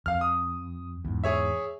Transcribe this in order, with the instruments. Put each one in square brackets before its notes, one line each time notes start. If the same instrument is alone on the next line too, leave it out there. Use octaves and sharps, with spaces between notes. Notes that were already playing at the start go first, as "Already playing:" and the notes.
[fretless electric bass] F2 [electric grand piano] F5 F6
[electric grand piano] D#6
[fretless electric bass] E2 G#2
[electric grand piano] G#4 C#5 E5